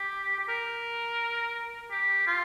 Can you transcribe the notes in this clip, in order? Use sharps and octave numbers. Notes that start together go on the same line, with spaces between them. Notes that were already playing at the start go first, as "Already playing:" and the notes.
Already playing: G4
G4
A#4
G4
F4